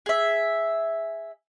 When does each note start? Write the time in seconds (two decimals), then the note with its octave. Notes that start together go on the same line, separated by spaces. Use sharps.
0.06 G#4 E5